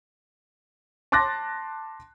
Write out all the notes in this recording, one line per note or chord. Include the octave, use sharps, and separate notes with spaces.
A5 C6 D6 F#6 A6 A#6